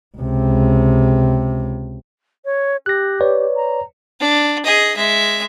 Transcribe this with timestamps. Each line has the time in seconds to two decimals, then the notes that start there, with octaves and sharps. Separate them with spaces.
0.17 C#2 C3
2.45 C#5
2.86 G4 F#6 A#6
3.21 B4 C#5 D5
3.56 A#5
4.21 D4
4.65 G#4 D#5
4.96 G#3 E5